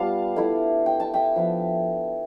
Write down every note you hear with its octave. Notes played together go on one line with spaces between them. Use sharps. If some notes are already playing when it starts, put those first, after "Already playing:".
Already playing: G3 B3 D4 F4 F5 A5
A3 E4
G5
A5
E5 G5
F3 B3 E4